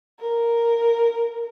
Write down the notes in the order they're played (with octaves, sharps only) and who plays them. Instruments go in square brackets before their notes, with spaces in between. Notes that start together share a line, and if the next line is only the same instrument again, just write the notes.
[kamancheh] A#4